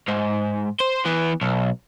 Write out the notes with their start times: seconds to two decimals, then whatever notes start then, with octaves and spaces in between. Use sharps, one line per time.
0.08 G#2
0.80 C5
1.05 E3 B3
1.41 B1